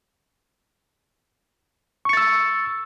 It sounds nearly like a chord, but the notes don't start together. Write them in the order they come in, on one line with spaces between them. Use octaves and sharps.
C#6 C#7 A6 E6